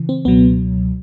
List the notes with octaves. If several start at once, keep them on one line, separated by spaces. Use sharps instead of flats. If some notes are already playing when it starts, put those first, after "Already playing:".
Already playing: C#3 E3
C4
C#2 B2 F#3 B3